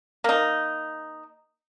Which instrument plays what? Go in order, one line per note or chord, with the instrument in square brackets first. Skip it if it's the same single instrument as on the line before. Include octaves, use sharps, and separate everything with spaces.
[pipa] A#3 D#4